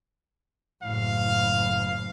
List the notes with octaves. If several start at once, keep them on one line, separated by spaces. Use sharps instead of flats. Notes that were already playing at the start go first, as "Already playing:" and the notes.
F#1 A2 F5